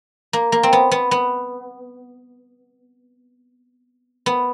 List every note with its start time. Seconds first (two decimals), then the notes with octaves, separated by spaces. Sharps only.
0.33 A#3
0.52 A#3
0.63 C4
0.73 B3
0.91 B3
1.11 B3
4.26 B3